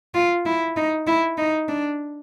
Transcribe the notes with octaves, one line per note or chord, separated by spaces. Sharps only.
F4
E4
D#4
E4
D#4
D4